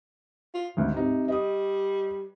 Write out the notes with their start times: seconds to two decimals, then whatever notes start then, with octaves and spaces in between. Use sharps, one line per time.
0.54 F4
0.77 G#1 D2 G#2
0.94 C3 D#4
1.28 G3 D#5 D#6